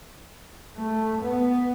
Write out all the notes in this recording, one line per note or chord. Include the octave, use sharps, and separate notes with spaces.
A3
B3